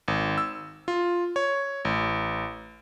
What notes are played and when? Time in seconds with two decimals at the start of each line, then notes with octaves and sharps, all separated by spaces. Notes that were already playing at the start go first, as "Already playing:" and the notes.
0.08 G#1
0.38 E6
0.88 F4
1.36 C#5
1.85 A1